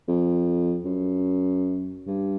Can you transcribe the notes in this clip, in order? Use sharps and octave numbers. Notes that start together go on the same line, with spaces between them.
F2
F#2
G2